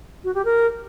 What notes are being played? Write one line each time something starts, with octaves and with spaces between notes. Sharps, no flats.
F#4
G4
A#4